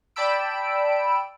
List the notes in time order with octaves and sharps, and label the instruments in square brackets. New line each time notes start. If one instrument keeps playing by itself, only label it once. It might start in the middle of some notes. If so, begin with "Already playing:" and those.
[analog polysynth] D5 G5 A5 B5 E6 D7